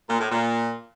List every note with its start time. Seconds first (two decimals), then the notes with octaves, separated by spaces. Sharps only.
0.09 A#2
0.19 A2
0.30 A#2